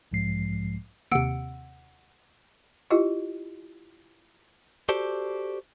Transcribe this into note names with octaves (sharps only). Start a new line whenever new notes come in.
B1 G#2 F3 G#3 C7
D#2 C3 F#5 E6 D7
E4 F4 G4 D#5
F#4 G4 A4 C5 D5